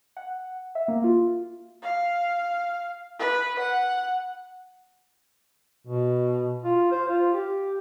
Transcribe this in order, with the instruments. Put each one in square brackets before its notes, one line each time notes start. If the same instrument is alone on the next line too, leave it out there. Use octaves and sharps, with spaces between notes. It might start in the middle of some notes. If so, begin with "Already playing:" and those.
[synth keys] F#5
E5
A#3
F4
[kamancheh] F5
B4
F#5
[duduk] B2
F4
C5
F4
G4